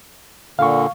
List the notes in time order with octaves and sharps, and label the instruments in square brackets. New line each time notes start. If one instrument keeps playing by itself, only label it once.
[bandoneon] A#2 D3 [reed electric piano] F5 C#6